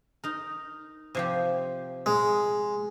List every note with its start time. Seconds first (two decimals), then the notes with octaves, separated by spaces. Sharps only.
0.24 D#4 A#4
1.15 C3 F3 G4
2.06 G#3